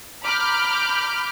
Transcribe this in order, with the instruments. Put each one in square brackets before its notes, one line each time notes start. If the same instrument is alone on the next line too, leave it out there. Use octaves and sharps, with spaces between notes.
[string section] A#5 B5 D6 F6 G6